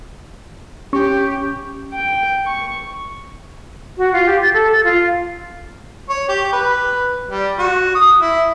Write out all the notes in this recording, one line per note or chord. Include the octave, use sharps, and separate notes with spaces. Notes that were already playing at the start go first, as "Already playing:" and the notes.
C#4 G4 C#6
G5
C#6
F#4
F4
G4
A6
A4
A6
F4
C#5
G4
B4
G3
F#4
D#6
E4